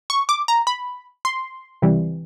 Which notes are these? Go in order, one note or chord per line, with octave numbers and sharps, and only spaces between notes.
C#6
D6
A#5
B5
C6
C#2 C3 E3 G3